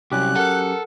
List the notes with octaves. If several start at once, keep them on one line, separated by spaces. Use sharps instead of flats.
C2 F#3 C#4 G4 F#6
A4 A#4 F#5